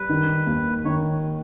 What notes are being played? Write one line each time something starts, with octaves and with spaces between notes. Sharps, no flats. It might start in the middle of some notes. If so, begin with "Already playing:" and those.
Already playing: G3 B4
D#3
D#2
D#3 C#5